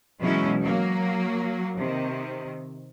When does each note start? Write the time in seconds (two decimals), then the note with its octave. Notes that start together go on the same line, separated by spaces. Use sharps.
0.21 B2 E3 F#3 G#3 C#4 E4
0.62 F#3 A#3
1.77 C3 D#3